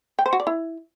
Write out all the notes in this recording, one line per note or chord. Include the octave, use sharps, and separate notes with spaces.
G5
C5
F#4
D5
E4